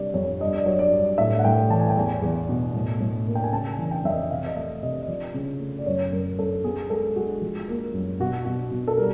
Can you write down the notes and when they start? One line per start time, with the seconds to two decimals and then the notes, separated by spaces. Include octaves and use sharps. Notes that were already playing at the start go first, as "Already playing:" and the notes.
Already playing: C3 G3 D5
0.14 F2 C#5
0.40 G2 D#5
0.54 D5
0.66 F#3 C#5
0.79 D5
0.93 G2
1.18 A2 E5
1.39 F#5
1.45 A2 G5
1.70 E3 A5
1.80 G#5
1.90 G5
1.97 E2 G#5
2.22 E2
2.49 B2
2.75 A2
3.00 A2
3.27 A#3
3.35 G5
3.44 G#5
3.52 C#3 A5
3.72 G#5
3.79 E3
3.91 G5
4.04 F2 E5
4.10 D#5
4.30 C3 F5
4.46 D#5
4.56 A3 E5
4.83 C3 D#5
5.01 D#5
5.08 F3 D5
5.34 C#3
5.60 A3
5.79 D5
5.86 F#2 C#5
6.12 F#2 A#4
6.38 F#2 A4
6.64 B3 G#4
6.89 G#3 A4
7.16 G#3 F#4
7.41 F3
7.68 A#3
7.93 F#2
8.20 B2 F#4
8.45 B2 F#4
8.71 B2
8.88 A4
8.97 G3 A#4